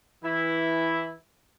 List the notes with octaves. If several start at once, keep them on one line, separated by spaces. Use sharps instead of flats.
E3 E4